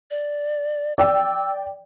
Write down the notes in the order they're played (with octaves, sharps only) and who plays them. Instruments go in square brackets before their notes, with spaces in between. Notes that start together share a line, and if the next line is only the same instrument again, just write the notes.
[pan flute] D5
[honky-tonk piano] D5 G5 [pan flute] E6